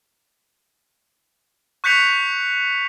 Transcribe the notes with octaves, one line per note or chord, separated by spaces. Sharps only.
C#6 F#6 G6 B6 C#7 F7